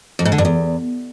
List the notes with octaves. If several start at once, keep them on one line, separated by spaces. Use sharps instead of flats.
F2
G#2
D3
G2
E2